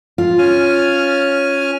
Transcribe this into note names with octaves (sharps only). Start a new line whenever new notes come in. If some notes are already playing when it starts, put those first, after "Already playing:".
F4
C#4 G#5 F6